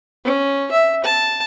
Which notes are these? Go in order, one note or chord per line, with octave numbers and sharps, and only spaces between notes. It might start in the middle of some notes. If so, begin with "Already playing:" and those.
C#4
E5
A5